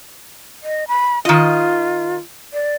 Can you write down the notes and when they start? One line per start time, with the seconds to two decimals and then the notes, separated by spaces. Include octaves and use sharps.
0.63 D#5
0.88 B5
1.25 D#3 F4 D#5
2.53 D5